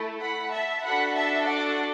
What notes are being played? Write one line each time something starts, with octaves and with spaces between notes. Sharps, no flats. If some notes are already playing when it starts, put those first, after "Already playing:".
Already playing: A3 E4 A4
F#5 B5
E5 A5
D4 F#4 A4 F#5 B5
E5 A5
D5 F#5